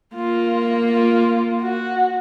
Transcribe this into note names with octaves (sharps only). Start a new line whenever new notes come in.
A#3 F4
F4
F#4